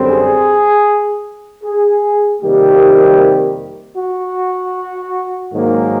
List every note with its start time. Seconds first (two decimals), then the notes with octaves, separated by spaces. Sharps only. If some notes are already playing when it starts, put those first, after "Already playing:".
Already playing: F#2 D3 G3 C4
0.09 G#4
1.64 G#4
2.41 F2 C3 D#3 G3 A#3 G4
3.97 F#4
5.53 G#2 D#3 F#3 A#3